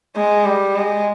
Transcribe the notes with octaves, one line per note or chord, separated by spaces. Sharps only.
G#3
G3
G#3